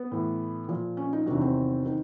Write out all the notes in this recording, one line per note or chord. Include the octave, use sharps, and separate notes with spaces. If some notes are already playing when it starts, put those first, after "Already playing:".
Already playing: B3
A2 E3
A#2 F3
C#4
D#4
E2 C3 D#3 F#3 D4
C4
D#3